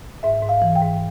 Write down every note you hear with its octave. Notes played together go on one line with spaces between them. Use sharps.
G#2 E5
G#2
F5
E3
G5
G#2